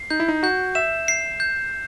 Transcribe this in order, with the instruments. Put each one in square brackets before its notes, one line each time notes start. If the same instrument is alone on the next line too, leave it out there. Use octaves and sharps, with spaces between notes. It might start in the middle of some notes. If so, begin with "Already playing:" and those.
Already playing: [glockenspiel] C7
[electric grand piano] D#4 [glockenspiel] G6
[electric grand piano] E4
D#4
[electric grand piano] F#4 [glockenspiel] G6
[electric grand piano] E5 [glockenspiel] E7
[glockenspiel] C7
G6